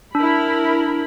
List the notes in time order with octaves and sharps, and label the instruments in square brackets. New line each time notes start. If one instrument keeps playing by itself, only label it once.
[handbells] D4 [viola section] E4 A#4 B5